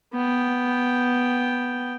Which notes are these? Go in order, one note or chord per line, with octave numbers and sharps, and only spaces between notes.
B3 G5